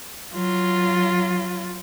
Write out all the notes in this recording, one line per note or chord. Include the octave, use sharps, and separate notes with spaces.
F#3 F4